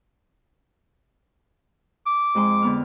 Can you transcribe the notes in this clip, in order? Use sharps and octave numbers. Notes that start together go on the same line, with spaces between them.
D6
F2 G#3 C6
D3 B3 F6